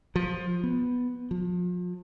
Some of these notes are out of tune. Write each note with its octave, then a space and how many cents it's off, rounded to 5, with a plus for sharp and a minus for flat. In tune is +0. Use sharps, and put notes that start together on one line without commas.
F3 +15
B3 +0
F3 +35